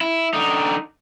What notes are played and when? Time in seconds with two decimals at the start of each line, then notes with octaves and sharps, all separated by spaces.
0.01 E4
0.34 D3 D#4